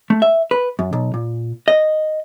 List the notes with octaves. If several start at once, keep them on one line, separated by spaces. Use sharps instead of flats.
A3
E5
B4
F#2
B1
A#2
D#5